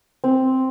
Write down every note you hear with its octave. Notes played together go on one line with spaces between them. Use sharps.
C4